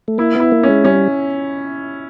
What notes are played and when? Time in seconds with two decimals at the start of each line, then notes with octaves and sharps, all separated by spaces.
0.08 A3
0.18 A#3 E4
0.35 B3
0.40 E4
0.52 A#3
0.63 G#3 C#4
0.85 G3 C#4